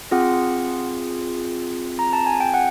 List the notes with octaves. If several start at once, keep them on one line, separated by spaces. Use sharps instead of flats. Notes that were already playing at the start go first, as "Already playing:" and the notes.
C4 F4 G#4 F#5
A#5
A5
G#5
G5
F#5